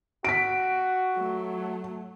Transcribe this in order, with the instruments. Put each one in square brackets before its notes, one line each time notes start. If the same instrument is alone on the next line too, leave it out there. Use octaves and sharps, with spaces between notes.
[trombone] F#4 [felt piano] B6 D7
[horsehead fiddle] F#3 A3